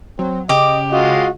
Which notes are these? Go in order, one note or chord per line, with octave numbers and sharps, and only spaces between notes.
F#3 C4
C#3 G4 D#5 D6
G#3 F4 F#4 D#5